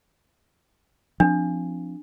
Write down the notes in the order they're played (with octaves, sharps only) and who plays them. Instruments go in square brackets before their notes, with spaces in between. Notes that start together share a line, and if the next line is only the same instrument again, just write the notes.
[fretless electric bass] F3 C4 [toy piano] D4